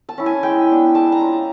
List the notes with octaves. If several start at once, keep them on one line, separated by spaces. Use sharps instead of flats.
A5
C#4 E4
G#5
G#3 G5
B3 D4
G#3 A5
A#5
C#4 F4